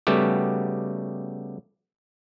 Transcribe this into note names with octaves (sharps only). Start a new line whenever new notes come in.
C#3 G3 A3 B3 F#4 G4